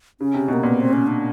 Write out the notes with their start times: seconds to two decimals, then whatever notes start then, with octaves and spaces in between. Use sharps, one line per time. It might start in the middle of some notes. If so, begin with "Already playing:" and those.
0.20 C#3 C#4
0.34 C3
0.48 B2 A#3
0.63 A#2 B3
0.80 C4
0.93 C#4
1.07 D4